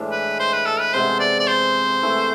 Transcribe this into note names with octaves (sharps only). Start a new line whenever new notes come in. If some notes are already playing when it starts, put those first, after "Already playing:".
Already playing: A2 E3 G#3 D4
B4
C5
B4
A4
B4
C3 G#3 B3 C5
D5
D5
C5
E3 A3 E4